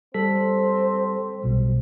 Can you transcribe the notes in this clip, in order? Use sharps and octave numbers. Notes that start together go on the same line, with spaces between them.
G3 C4 A4 B6
B1 B2 G3